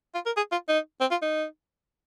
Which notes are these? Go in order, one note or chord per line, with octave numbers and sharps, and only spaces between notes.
F4
A#4
G#4
F4
D#4
C4
F4
D#4